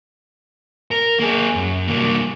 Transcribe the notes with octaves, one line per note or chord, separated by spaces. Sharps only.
A#4
A#3 G#4
F#2
C2 A#3